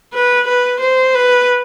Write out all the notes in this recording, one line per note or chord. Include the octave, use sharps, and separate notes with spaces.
B4
B4
C5
B4